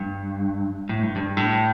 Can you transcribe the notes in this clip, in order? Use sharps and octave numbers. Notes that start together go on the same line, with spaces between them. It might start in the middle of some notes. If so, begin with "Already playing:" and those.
Already playing: G2
A2
G2
G2
A2